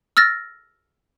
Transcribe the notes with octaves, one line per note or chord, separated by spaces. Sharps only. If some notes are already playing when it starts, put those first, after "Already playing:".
E6 F6 A6 A#6